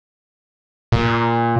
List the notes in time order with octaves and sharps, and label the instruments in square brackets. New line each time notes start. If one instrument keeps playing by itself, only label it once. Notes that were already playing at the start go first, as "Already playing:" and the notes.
[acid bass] A#2